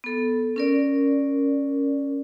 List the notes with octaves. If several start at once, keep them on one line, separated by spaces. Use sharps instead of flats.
B3 A4
C#4 A#4 D5